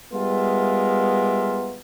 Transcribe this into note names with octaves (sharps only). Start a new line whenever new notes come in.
G3 G#3 B3 F4 A#4 E5